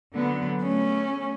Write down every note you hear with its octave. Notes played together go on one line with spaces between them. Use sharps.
D3 F#3 B3
A3 C#4